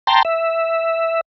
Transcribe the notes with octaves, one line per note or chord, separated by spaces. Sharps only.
G5 A5 A#5 C6
E5